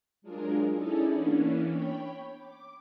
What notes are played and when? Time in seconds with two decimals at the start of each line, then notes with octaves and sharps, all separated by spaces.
0.22 F#3 G#3 D4 F4 G#4 A#4
0.72 C#4 D#4 E4 G#4 A4 D5
1.10 E3 A#3 B3 C#4 D4
1.66 C#5 G5 B5
2.35 D6